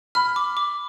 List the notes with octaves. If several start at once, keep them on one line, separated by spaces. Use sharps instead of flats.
B5 F6
D6
D6